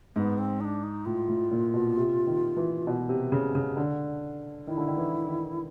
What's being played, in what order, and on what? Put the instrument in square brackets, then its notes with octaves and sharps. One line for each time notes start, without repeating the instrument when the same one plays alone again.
[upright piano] G#2 [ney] B3
[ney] C4
D#4
D4
D#4
[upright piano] A2 [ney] F4
[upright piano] A2
A#2
B2
C3
D#3
E3
B2
C3
C#3
C#3
D3
[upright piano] D#3 [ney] E4
[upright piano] D3
D#3
E3
D#3